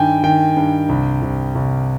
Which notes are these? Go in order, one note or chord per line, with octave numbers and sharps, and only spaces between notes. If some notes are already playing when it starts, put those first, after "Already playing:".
Already playing: G2 D#3 G5 G#5
D#3 G5
G2
C2
C2
C2